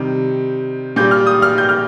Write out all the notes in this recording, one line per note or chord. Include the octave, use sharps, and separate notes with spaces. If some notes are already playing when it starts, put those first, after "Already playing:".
Already playing: C3 D#3 G3
A#2 G3 G6
F6
D#6
F6
G6
F6